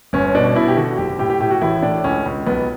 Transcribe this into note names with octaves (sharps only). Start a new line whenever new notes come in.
G1 C#4
B2 D4
B2 E4
G4
D3 F#4
F#1 G4
A2 G4
G4
A2 G4
F#4
A1 E4
A2 D4
C#2 C#4
C#2
B1 B3